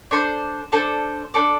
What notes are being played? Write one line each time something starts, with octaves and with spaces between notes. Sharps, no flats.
D4 A4 C5
D4 A4 C5
D4 A4 D5